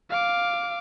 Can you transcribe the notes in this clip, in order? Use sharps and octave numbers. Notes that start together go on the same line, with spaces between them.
F5 D6